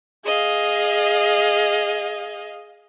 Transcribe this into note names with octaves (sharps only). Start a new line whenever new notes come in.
G#4 D#5 F5